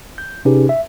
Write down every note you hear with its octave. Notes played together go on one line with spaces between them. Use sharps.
G6
C3 C#4 D#4 G4 G#4 B4
E5